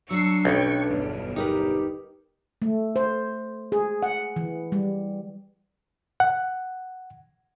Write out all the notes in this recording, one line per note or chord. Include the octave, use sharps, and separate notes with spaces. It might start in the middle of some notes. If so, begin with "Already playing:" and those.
F#3 D4 C#6 E6 C7
B1 A3 C#4 B4 G5 C#6
G1 E2
D#4 G4 A#4 B4
A3
C5
G#4
F#5
E3
G3
F#5